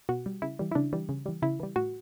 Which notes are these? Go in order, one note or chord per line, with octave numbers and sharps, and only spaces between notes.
B2 F#4
G3
C#3 E4
E3 G3
E4
C#3 D4
E3 G3
C#3
E3 G3
C#3 E4
E3 G3
A2 F#4